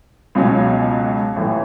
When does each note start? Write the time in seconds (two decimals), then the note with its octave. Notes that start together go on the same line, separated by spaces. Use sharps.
0.35 C#2 B2 F#3 C#4
1.36 A1 A2 E3